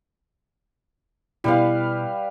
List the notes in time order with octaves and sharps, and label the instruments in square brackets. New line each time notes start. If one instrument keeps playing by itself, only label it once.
[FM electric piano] B2 E4 [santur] G3 B4 F5